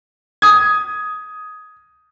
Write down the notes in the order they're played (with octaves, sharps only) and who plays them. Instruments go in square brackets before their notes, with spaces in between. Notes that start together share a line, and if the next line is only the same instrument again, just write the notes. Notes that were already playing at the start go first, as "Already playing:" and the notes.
[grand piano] D#6 G#6